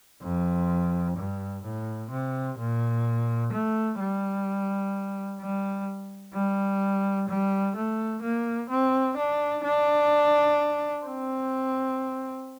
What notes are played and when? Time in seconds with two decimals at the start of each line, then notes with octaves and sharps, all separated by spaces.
0.22 F2
1.17 G2
1.64 A2
2.11 C3
2.58 A#2
3.52 A3
3.99 G3
5.41 G3
6.34 G3
7.28 G3
7.76 A3
8.22 A#3
8.69 C4
9.17 D4
9.64 D4
11.05 C4